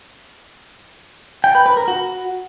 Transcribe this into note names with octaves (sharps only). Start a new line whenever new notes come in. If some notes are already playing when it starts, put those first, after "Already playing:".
G5
B4
B4
A#4
F#4